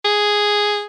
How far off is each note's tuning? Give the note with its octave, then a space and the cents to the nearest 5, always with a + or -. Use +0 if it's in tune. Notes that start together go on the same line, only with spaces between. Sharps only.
G#4 +0